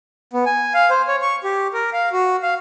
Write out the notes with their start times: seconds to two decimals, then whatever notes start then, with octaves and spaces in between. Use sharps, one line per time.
0.33 B3
0.46 G#5
0.74 F5
0.90 C5
1.08 C#5
1.22 C#6
1.44 G4
1.73 A#4
1.93 F5
2.12 F#4
2.43 F5